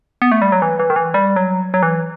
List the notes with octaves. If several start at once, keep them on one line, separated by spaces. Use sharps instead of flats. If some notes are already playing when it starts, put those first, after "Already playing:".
B3
A3
G3
F#3
E3
E3
D#3
E3
G3
F#3
F#3
E3